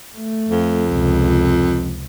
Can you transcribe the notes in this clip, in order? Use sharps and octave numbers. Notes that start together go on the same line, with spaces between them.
A3
F2
C#2 C3